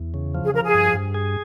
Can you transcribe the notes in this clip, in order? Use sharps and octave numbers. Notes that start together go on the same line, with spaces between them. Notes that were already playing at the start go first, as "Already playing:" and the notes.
Already playing: E2
C#3
F3
G#4
F3 A#4
G#4
G2
G2
G#4